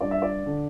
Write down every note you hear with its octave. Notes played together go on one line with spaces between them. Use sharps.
G2 D5
E5
D5
D3